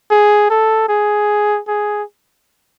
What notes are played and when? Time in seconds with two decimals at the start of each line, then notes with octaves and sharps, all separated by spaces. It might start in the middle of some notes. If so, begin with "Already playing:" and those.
0.11 G#4
0.50 A4
0.89 G#4
1.68 G#4